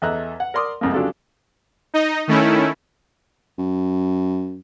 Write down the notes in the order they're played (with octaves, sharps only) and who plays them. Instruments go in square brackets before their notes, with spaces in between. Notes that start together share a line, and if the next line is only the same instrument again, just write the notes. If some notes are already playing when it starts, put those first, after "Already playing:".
[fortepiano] E2 A4 D#5 E5 A#5 F#6
F#5
A#4 D5 C6 D6 D#6
C2 F2 G#3 A#3
C#3 F#3 D4 F4 G4 A4
[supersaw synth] D#4 D#5
D#3 A3 C#4 E4
[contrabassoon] F#2